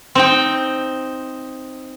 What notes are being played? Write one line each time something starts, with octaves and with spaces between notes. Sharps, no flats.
C4 D#4 G5